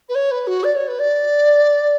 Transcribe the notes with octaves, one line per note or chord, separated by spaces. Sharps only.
B4
C#5
B4
F#4
D5
C#5
B4
D5